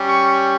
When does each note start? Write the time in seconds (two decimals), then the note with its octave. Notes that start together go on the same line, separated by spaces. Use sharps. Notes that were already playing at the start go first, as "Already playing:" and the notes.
Already playing: G3 C#4 G4
0.09 C#6